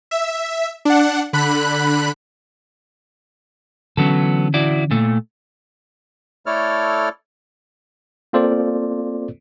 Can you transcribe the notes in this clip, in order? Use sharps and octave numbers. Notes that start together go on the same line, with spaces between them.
E5
D4 F#5
D3 B5 F#6
D3 E3 F#3 B3 C#4 A4
E4 F#4 D5
A#2 A3
A3 E4 A4 C#5 D5 F6
A#3 C4 F4 A4 C5 D5